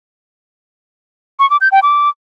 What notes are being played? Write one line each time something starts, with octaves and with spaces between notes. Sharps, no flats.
C#6
D6
G6
G5
D6